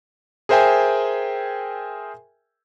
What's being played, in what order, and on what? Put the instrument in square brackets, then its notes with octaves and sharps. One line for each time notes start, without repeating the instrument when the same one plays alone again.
[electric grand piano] G#4 A#4 C5 E5 G5 G#5